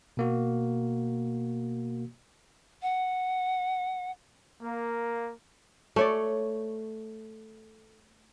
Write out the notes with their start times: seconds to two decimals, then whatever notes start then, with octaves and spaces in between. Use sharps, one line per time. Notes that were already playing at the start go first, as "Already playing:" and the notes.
0.17 B2 A#3 F#4
2.82 F#5
4.62 A#3
5.96 A3 C#5 D5